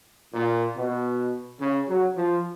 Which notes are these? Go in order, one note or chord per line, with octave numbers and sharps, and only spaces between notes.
A#2
B2
C#3
F#3
F3